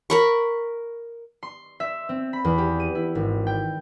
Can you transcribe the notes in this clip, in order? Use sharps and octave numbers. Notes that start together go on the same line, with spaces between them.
A#4 B5 C#6
C6
E5
C4
B5
E2
G4
D#7
E4
G#1
G5